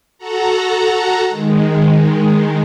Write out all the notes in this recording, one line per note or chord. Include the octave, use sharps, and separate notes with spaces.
F#4 A4 F#5 A#5
D#3 G#3